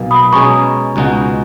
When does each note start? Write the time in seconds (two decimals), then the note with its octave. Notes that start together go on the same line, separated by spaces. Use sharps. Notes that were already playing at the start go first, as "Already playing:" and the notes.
Already playing: B1 B2 A#3
0.11 B5 D#6
0.32 B2 G#3 C#4 G#4 A#5 C#6
0.96 C#2 B2 G#3 D#4 F#4